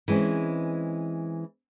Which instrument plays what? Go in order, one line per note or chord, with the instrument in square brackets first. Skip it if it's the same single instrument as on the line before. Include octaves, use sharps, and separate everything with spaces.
[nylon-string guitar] E3 G#3 C4 C#4 E4